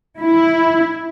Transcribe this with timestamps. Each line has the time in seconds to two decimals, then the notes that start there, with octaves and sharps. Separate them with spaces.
0.20 E4